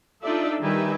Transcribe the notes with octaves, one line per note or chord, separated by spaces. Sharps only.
D4 D#4 F4 A4 D5 E5
D#3 G3 G4 B4 E5 G#5